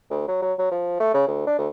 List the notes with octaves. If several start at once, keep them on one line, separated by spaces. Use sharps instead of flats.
D2
F#3
F#3
F#3
F3
A3
C#3
D2
D4
D2